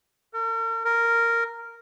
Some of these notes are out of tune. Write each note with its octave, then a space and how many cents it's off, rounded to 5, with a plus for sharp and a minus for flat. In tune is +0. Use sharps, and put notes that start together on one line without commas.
A#4 -45
A#4 -5